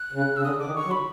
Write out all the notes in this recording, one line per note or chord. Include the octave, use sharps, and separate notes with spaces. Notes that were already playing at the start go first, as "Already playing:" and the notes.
Already playing: F#6
C#3
C#3 E6
D3 D#6
D3 D6
D#3
C#6
F#3
B5